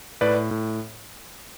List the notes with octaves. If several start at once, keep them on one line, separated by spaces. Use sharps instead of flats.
A2 B4 D5
A2